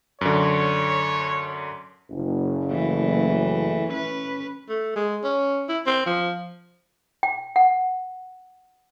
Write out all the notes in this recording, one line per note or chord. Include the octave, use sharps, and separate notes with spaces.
F#2 D3 C#5
F#1
E3 A3
C#4 B4
A3
G#3
C#4
E4
C4
F3
G5
F#5